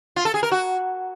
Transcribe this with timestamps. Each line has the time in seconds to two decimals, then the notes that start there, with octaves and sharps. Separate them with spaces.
0.16 F4
0.25 A4
0.34 G#4
0.43 A#4
0.52 F#4